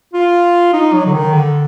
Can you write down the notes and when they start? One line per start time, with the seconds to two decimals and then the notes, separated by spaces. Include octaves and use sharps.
0.13 F4
0.73 D#4
0.93 F#3
1.07 D3
1.13 D#3
1.33 D3